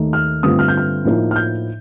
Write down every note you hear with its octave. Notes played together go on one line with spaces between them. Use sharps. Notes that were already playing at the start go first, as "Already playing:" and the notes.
Already playing: D#2 D#3 A3 D#4
F6
G2 D3 A3 C4 F4 D#6
F6
G6
F6
A2 F3 A#3 D#4
F6
G6